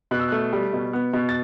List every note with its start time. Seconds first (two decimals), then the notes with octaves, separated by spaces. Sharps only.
0.11 B2 F#6
0.20 E6
0.28 A3 F#6
0.53 G3
0.73 B2
0.93 B3
1.13 B2
1.29 A6